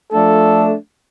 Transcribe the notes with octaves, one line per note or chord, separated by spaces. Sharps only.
F3 A3 D4 A4